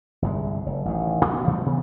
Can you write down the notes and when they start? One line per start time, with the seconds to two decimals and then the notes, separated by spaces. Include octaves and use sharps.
0.22 G1 C2 G#3
0.66 F#1
0.85 A1 D#3
1.25 B2
1.47 B2 F3 G3 A3
1.66 C3 E3 B3